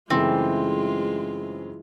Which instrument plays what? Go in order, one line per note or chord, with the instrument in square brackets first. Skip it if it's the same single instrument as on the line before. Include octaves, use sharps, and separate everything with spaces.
[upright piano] F#2 C#3 A3 [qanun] E3 [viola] G#3 F4 [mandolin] C4